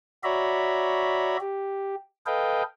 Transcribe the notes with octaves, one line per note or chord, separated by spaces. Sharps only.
F#4 C#5 D5 E5 A#5 B5
G4
A4 B4 D#5 F5 G5